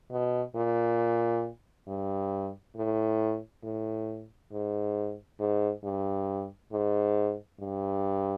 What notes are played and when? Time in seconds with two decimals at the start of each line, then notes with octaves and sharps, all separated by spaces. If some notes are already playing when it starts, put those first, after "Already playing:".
0.11 B2
0.55 A#2
1.88 G2
2.76 A2
3.64 A2
4.52 G#2
5.40 G#2
5.84 G2
6.72 G#2
7.60 G2